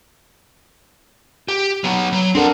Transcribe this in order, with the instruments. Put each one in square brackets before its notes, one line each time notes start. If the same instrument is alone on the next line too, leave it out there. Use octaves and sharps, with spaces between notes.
[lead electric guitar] G4
F#3 B3
F#3
[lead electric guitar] C4 F#5 [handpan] D4 A4 A#4